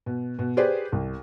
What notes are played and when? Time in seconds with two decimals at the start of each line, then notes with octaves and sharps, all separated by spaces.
0.06 B2
0.39 B2
0.57 G4 G#4 B4 C5 D5
0.92 C2